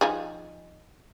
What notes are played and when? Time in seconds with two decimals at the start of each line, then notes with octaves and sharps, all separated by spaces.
0.01 F3 D#4 G#4